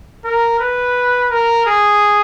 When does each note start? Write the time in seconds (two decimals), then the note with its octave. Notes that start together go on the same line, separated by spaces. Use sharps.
0.24 A#4
0.60 B4
1.31 A#4
1.66 G#4